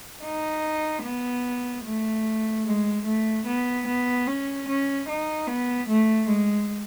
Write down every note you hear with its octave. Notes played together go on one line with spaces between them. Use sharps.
D#4
B3
A3
G#3
A3
B3
B3
C#4
C#4
D#4
B3
A3
G#3